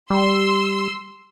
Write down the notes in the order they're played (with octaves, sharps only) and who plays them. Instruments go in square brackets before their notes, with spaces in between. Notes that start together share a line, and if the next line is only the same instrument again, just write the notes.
[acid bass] G3 [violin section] C6 E6